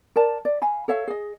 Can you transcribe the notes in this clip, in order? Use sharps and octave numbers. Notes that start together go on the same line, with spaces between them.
A#4 D5 A5
D5
F5 G#5 B5
A4 C#5 E5 F5
G#4 D#5